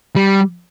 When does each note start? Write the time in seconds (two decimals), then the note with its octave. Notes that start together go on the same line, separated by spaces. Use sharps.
0.16 G3